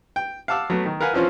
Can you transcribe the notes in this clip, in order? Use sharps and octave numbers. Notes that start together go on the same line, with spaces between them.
G5
F5 F#5 A5 D6 E6 F6
F#3 A3 B3
D#3
A#4 B4 F5 F#5 G#5
E3 F3 C4 C#4 F4